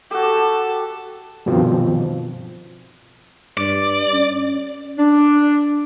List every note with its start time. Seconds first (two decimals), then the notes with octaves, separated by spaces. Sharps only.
0.11 F#4 G4 A4 A5
1.46 G2 B2 D#3 F3 C4
3.57 G2 D5
4.13 C#4
4.97 D4